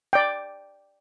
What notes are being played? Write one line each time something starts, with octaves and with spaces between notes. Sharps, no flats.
D5 G5